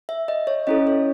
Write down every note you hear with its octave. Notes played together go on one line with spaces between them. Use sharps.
E5
D#5
C#5
C#4 E4 A4 D#5
C#5